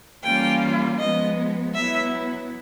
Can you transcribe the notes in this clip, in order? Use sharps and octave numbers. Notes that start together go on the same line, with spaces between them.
E3 G3 A#3 C#4 F4 G5
F3 G#3 B3 D#5
F#3 B3 E4 E5